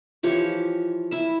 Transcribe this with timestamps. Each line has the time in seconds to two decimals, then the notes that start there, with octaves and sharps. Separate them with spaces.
0.23 E3 F3 G4 C#5
1.11 E4 E5